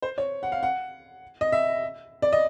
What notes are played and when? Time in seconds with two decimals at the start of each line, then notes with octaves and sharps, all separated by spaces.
0.02 C5
0.18 C#5
0.43 F#5
0.52 F5
0.63 F#5
1.41 D#5
1.52 E5
2.22 D5
2.33 D#5